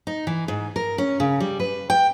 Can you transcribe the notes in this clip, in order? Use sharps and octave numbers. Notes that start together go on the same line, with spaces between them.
D#4
E3
G#2
A#4
C#4
C#3
G3
B4
G5